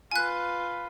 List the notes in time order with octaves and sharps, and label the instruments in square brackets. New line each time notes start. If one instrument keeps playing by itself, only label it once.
[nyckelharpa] F4 B4 [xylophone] G#5 F#6